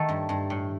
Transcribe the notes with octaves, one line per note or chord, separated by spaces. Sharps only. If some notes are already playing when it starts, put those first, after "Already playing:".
Already playing: D#3 A3 A4
G2
G2
A2